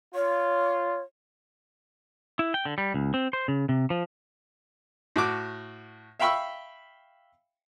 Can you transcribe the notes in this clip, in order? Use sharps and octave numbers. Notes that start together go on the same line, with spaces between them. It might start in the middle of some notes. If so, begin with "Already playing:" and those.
F4 C#5
E4
G5
D3
G3
C#2
C4
C5
C#3
C3
F3
A2 F#4 D6
E5 F5 G5 B5 C#6 E6